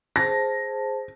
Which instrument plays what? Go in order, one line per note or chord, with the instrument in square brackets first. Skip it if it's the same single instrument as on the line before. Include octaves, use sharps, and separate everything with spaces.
[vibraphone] G#4 C5 A5 [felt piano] A#6